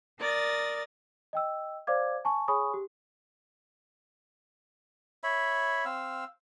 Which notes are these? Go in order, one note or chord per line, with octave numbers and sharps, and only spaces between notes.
A#4 D5 D#6 A6
D#5 G5 E6
C5 D5 F5 D6 G#6
G#5 A5 C#6
G#4 C#5 G#5 B5 C#6 D#6
G4
C#5 E5 B5
C4 F5 E6